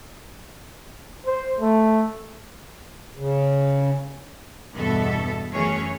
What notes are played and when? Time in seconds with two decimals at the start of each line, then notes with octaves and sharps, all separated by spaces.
1.27 C5
1.61 A3
3.16 C#3
4.74 E2 G2 B2 B3 A4 E5
5.52 F#2 E3 A3 C#4 G#4 C#5